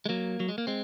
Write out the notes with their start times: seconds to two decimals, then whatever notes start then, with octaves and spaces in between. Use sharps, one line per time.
0.06 G#3
0.09 F#3 A#3
0.40 F#3
0.49 G#3
0.58 A#3
0.67 G#3 C4